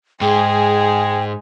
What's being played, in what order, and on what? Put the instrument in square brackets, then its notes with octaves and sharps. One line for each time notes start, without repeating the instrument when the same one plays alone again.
[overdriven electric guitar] G#2 [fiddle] G#3 G#4 [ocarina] G5